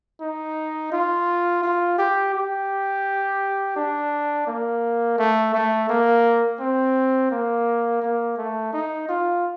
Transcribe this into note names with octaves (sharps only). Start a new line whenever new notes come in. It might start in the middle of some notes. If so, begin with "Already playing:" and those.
D#4
F4
F4
G4
G4
D4
A#3
A3
A3
A#3
C4
A#3
A#3
A3
D#4
F4